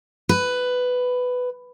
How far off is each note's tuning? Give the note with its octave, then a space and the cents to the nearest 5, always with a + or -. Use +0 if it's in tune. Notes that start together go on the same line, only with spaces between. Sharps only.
B4 +10